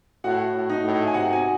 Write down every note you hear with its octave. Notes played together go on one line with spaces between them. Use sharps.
A2 F#4 F#5
A2
D#4 D#5
A2
G#5
C3 F#4 F#5
G#5